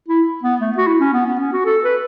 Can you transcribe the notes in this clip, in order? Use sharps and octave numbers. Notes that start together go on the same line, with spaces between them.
E4
B3
A3
F#4
E4
C#4
B3
B3
C#4
F#4
A4
B4